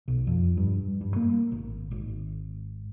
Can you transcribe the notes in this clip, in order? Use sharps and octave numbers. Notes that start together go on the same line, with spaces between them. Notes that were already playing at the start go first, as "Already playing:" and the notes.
B1
F2
G2
G2
A#3
G#1
G#1